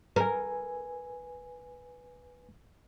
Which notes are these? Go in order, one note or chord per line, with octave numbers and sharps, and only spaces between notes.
A#4 B4 G#5